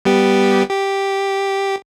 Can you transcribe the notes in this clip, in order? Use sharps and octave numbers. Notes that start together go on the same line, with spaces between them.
G3 B3 G4
G4